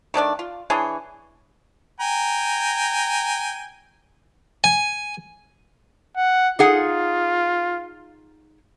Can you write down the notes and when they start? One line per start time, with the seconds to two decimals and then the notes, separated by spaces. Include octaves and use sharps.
0.14 D#3 A3 D4 D5
0.39 F4
0.70 E3 D4 G#4 C#5
2.00 G5 G#5 A#5
4.64 G#5
6.17 F#5
6.59 D#4 F4 G#4 F#5